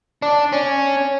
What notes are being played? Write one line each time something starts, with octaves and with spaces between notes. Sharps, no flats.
D4
C#4